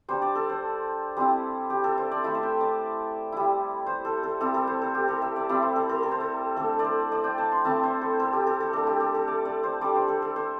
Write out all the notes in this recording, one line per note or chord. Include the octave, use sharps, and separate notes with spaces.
G3 D4 C5
D5
A4
C5
G3 C4 E4
G4
A4
C5
D5
A3 E4 E5
E5
G5
D5
G3 E4
C5
A4
A4
G3 C4 E4 A4
A4
C5
A4
G4
A4
E5
D5
G3 C4 E4 D5
C5
A4
A4
A4
C5
A4
A3 D4 A4
D5
C5
D5
G5
A5
C6
A3 C4 E4 A5
C5
A4
A4
G4
A4
A4
A3 D4 A4
G4
A4
A4
D5
D5
C5
G3 D4 D5
C5
A4
A4
C5